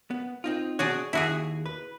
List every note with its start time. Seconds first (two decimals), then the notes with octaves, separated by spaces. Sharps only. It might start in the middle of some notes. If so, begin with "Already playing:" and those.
0.11 B3
0.44 C4 D#4 F4
0.79 B2 F#4 G#4 C#5 D5
1.13 D#2 E4 F#4 G#4
1.66 B4